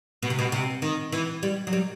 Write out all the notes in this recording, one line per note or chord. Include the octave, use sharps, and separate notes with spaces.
B2
C3
B2
C3
D#3
E3
G3
F#3
G3